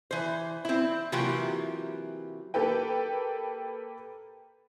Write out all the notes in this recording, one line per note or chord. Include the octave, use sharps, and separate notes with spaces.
E3 C5
C4 E4
C3 E3 F#3 A#3 F4 G4
A#3 G4 A4 B4 G5